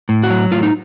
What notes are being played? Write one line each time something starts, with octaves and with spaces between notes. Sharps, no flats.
A2
F#4
F#3
A2 F4
D#4